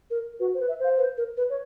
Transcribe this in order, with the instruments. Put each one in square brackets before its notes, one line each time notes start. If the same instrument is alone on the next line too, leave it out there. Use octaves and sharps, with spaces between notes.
[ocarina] A#4
[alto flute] F#4 [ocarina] B4
[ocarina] C5
[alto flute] B4
[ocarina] E5
[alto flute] C5 [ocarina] F5
[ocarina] B4
A#4
B4
[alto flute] C#5